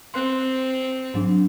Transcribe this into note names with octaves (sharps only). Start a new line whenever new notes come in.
C4 C6 F#6
G#2 F#3 D4